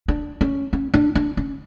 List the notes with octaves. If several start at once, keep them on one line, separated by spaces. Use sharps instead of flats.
D4
C#4
C#4
D4
D4
C#4